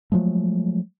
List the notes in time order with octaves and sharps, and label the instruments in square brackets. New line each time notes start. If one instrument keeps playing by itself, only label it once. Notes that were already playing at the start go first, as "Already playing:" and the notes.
[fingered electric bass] F3 F#3 G#3 A3